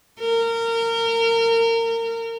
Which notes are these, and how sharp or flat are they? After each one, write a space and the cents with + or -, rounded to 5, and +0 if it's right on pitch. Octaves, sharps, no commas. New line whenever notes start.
A#4 -25